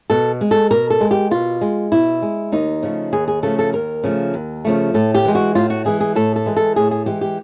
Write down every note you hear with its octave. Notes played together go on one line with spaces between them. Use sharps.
B2 A4
G#3
A4
B2 A#4
A4
G#3
G4
B2 F4
G#3
B2 E4
G#3
D#2 D#4
C#3 F3 A3
D#2 G#4
G#4
C#3 F3 A3 A4
A4
D#2 A#4
C#3 F3 A3
D#2
C#3 F3 A3
A2 A4
G4
E3 G#3
F#4
A2 F4
F#4
E3 G#3 G#4
G#4
A2 A4
A4
E3 G#3
A4
A2 G#4
G#4
E3 G#3 G4
G4